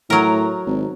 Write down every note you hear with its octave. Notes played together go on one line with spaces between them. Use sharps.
A2 F#3 A#4
G#1